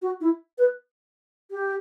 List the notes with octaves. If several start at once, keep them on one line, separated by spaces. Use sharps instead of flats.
F#4
E4
B4
G4